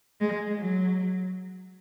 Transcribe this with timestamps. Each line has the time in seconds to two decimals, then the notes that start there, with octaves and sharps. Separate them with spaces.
0.21 G#3
0.59 F#3